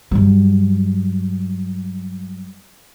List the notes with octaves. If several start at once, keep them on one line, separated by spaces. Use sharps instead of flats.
G2 F#3